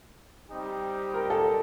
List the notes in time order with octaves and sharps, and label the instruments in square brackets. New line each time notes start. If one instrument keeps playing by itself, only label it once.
[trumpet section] G3 C4 D#4 G4
[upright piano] A#4
A4